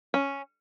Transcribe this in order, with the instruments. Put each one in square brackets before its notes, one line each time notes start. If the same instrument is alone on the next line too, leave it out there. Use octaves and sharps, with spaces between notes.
[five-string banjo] C#4